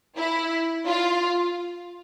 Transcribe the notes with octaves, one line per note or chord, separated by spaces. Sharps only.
E4
F4